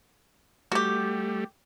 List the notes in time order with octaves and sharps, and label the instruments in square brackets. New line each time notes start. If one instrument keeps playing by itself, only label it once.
[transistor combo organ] G3 A3 [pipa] F#4 G4